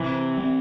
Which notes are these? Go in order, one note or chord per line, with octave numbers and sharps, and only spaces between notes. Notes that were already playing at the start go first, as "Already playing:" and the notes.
Already playing: C3 E3
G3 C4